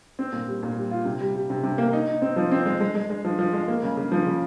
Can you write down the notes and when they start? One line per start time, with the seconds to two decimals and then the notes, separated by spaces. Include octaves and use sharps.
0.19 C4
0.32 A#2
0.47 G3
0.63 A#2
0.77 G3
0.91 F4
1.05 C3
1.21 G3
1.35 G3
1.50 C3
1.64 C3
1.78 A#3
1.93 D#4
2.08 D#4
2.22 C4
2.36 F3
2.51 C4
2.66 G#3
2.81 G#3
2.95 G#3
3.10 G#3
3.25 F3
3.39 F3
3.53 G#3
3.68 A#3
3.83 C#3
3.97 C#3
4.12 F3
4.26 C#3